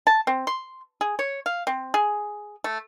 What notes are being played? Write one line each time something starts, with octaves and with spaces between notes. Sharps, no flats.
A5
C4
C6
G#4
C#5
F5
C4
G#4
A3